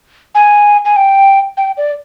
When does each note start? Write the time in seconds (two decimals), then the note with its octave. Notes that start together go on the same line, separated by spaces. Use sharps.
0.35 G#5
0.85 G#5
0.96 G5
1.57 G5
1.77 D5